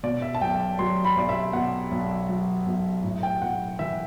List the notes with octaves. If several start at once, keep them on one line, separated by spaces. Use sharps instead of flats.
B2 D5
E5
A5
B1 G5
A5
F#3 C6
B5
B1 D5
E5
B2 F#5
B1
F#3
B1
A2
G5
B1 F#5
E3 E5